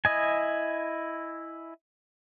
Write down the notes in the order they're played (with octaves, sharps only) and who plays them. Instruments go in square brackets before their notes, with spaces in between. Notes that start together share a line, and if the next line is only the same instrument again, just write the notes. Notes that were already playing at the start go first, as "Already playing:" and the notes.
[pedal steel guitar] E4 D#5 G#5